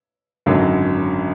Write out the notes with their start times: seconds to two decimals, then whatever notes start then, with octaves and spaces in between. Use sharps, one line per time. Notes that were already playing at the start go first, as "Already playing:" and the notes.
0.46 G#1 F#2 D3 F#3